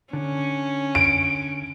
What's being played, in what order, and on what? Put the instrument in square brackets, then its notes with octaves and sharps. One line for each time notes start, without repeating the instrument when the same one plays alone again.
[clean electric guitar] D3 [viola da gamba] C#4
[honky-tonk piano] D7